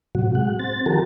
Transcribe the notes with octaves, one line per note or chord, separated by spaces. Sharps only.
A2 C3 F#3 F#4
G#3 F#5
C4 A6
D#3 F3 F#4 G4 A4 A#4